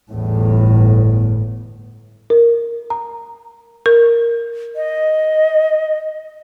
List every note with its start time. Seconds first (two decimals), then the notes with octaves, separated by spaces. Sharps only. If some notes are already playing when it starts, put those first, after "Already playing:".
0.11 G1 E2 A2
2.30 A#4
2.90 A#5
3.86 A#4
4.76 D#5